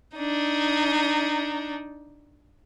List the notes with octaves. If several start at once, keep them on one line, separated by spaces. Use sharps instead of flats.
D4 D#4